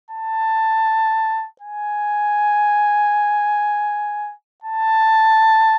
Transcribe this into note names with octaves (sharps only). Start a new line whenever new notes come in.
A5
G#5
A5